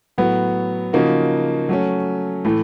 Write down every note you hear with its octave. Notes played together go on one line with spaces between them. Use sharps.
A2 F#3 B3
C#3 F3 A#3 D#4 F#4
F#3 A3 C#4
A2 E3 A3